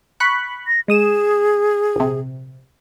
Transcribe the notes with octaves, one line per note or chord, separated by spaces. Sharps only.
B5 C#6 F#6
A#6
G#3 G#4 D#6 E7
A#1 C3